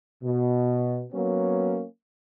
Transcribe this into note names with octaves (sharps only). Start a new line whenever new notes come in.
B2
F#3 A#3 B3 C#4